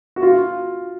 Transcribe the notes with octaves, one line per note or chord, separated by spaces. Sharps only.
F#4
F4